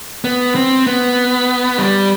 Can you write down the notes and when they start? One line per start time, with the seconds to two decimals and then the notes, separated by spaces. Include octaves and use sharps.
0.24 B3
0.55 C4
0.87 B3
1.78 G3